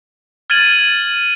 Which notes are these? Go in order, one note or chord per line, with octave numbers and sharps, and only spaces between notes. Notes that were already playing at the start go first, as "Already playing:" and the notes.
F6 G#6 A6 D#7 F#7